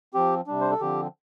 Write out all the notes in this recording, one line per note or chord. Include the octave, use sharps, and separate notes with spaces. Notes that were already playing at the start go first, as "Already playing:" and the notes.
F3 C4 G4
C3 G3 D4
C5
A4
D3 F3 C4 G4